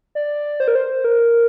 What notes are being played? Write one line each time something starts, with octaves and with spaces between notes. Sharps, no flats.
D5
C5
A#4
C5
A#4